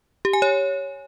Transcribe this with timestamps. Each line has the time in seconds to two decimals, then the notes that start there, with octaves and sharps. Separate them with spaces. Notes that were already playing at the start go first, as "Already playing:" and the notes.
0.25 G4
0.33 G#5
0.42 C#5